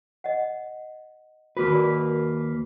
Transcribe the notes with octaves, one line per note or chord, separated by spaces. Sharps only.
D#5 F#5
D#2 A#3 F#4 B4
A#4 D5